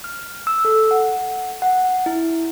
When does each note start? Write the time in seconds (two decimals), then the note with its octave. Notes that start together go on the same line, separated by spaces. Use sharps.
0.04 F6
0.47 E6
0.65 A4
0.91 F#5
1.62 F#5
2.06 E4